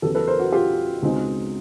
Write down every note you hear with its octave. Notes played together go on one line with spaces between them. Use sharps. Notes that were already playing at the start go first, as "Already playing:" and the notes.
E2 C#3 F#3 B3 G4 A4
A4 B4
A#4 C5
F#4
F4 G4
C#2 B2 G#3 C4 D#4